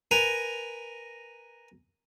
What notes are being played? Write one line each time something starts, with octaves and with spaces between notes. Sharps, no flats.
A#4 B4 G#5 A#5